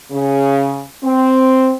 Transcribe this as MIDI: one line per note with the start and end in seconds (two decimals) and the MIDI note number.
0.11 0.81 49
1.04 1.73 60